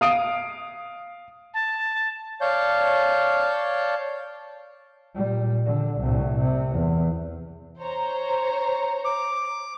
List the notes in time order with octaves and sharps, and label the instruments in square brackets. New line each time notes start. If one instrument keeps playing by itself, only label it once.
[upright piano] F5 D#6 D7
[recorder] A5
[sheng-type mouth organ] C#5 D5 F5 A5 G6
[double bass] A#2 G3
D3
C2 A2
C3
E2
[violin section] C5 C#5 A#5
[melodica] D6